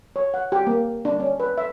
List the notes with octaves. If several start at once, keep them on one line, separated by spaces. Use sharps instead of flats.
C#5
F#5
G4
A#3
D4
C#4
B4
E5